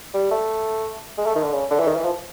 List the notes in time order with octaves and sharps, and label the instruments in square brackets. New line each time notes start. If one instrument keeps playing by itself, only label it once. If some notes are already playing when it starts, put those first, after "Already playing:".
[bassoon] G3
A3
G#3
A3
D#3
D3
C#3
D3
E3
D#3
E3
F3